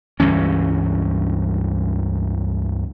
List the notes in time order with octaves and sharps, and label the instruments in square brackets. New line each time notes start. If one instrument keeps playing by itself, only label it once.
[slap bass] C#2 G2 E3 C#4